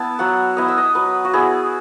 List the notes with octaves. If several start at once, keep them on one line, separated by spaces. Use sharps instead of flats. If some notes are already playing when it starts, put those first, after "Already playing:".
Already playing: B3 E4 A5
F#3 F#5
B3 E4 D#5
E5
D#5
F#3 B4
F#4
B3 E4 G#4